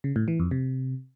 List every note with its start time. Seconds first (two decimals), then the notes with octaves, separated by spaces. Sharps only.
0.04 C#3
0.16 A2
0.28 E3
0.40 F2
0.51 C3